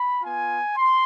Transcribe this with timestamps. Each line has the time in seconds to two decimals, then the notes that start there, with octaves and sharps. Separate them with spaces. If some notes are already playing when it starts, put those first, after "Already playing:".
Already playing: B5
0.22 B3 F4 G#5
0.76 C6